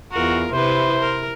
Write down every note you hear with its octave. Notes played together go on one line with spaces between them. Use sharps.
E2 F4 F#4 A#4
C3 E4 B4 C5
A#4